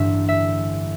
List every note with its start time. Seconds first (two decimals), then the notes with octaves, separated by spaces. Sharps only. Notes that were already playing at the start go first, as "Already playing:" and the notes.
Already playing: A1 G2 D3 E5
0.28 E5